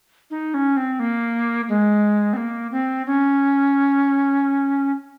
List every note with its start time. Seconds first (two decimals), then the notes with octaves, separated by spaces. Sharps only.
0.31 D#4
0.54 C#4
0.77 C4
1.00 A#3
1.69 G#3
2.33 C4
2.37 A#3
2.72 C4
3.06 C#4